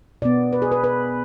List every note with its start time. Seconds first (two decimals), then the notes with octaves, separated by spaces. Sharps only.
0.22 B2 B3 D5
0.53 B4
0.62 G#4
0.72 B4
0.84 B4